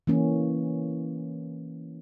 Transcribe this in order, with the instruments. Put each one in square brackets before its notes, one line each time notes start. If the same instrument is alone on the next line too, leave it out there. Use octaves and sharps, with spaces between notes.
[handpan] E3 A#3 C#4